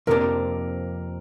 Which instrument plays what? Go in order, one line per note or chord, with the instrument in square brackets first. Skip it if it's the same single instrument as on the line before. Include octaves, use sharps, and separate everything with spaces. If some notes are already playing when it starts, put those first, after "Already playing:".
[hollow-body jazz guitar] F2 C3 F3 A#3 D4 [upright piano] A#4